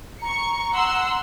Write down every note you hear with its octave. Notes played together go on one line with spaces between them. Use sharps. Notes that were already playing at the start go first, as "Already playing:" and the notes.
A#5 C#6 C#7
F#5 C6 E6